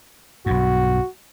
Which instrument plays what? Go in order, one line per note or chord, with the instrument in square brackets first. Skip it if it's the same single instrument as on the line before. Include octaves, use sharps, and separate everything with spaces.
[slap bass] B1 G2 [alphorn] F#4